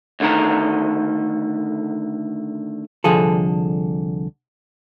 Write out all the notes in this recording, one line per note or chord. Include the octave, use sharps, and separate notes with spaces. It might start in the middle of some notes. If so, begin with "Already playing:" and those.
D2 D3 D#3 A4 A#5
C2 D3 F3 G#4 A4